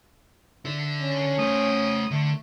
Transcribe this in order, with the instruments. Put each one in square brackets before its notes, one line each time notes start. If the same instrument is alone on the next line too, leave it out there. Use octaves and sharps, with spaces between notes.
[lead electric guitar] D3 A4 [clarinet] E5
[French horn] C#4
[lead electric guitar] A3 C5 [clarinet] D#6
[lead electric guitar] D3 [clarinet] A3